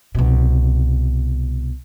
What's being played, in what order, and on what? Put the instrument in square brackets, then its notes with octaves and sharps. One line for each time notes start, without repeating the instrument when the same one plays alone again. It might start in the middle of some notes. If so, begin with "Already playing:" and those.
[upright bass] C2 B2